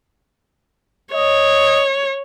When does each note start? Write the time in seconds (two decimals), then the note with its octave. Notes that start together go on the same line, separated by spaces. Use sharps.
1.14 C#5 D#5